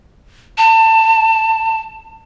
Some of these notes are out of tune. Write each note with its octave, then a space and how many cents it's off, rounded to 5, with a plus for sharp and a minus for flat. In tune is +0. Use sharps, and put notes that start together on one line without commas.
A5 +25